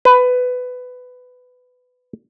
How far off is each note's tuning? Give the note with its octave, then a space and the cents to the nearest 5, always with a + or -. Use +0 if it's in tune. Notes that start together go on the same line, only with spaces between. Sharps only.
B4 +15